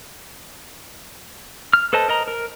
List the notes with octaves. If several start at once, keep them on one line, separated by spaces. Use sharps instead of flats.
F6
A4 B4 C5 D#5 A5
A#4 D#5 A#5
A#4